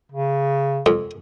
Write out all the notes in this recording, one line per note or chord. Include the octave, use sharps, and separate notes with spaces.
C#3
F2